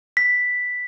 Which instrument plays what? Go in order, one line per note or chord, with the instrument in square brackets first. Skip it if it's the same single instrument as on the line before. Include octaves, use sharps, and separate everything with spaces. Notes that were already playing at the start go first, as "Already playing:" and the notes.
[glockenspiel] B6